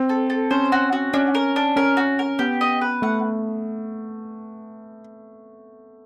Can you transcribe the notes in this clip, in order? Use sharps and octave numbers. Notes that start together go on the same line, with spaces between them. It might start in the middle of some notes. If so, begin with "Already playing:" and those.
Already playing: C4
A4
A4
C#4 C5
F#4
F#4
C#4 D4
A#4
D4
C#4 A#4
F#4
A#4
B3 G4
D#5
B4
A3 F#5